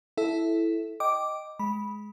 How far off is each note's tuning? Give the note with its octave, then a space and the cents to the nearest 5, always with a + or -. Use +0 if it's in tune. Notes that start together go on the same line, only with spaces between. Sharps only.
E4 +0 A4 -10 E5 +0
D#5 +0 G5 -5 D6 +0
G#3 +15 B5 -10